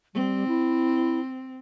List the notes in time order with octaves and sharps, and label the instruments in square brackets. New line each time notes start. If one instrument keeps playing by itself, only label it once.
[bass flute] G3 [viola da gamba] C4
[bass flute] E4